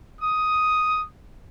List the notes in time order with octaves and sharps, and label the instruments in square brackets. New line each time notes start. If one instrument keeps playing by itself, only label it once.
[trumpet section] D#6